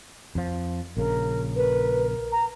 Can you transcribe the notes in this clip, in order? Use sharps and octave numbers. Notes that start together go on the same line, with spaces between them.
F2 F3
A#1 C#3 A#4
A#4 B4
A#5